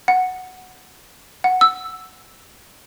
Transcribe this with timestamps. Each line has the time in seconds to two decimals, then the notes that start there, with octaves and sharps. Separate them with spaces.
0.08 F#5
1.44 F#5
1.61 E6